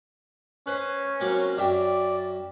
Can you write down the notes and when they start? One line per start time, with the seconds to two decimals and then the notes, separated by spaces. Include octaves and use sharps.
0.67 C#4 B4 C5
1.20 F#3 A#3 C4
1.58 F#2 D5 E5 G5